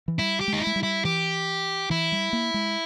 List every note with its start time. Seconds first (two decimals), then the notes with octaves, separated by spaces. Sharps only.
0.08 E3
0.19 G3 E4
0.40 G4
0.48 G#3
0.53 D#4
0.61 E4
0.67 G#3
0.76 G3
0.83 E4
1.05 E3 G4
1.90 E3 E4
2.12 G3
2.33 A#3
2.54 G#3